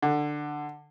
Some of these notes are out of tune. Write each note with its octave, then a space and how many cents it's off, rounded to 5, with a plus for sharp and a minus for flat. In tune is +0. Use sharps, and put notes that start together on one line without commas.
D3 +15